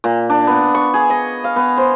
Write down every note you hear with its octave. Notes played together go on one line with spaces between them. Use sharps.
A#2
D4
B3
C#6
G#4
D#5
F5
B3
C5